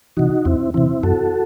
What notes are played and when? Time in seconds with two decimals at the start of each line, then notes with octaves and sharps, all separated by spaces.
0.17 C3 E3 D#4 F#4
0.45 E2 C4 E4
0.74 C3 E3 C4 E4
1.03 F#2 F#4 A4